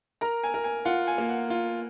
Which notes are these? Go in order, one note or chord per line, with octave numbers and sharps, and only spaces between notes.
A#4 A#5
G#5
A#4
G#5
F4 F#5
G#5
A#3
F#5
F4